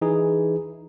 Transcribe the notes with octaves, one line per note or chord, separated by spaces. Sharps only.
E3 D#4 G#4